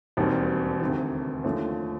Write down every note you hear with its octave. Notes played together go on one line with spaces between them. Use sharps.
E1 D#2 D#3 G3 C4
D2 C3 D#3
D#2 D3 F3 A3 C#4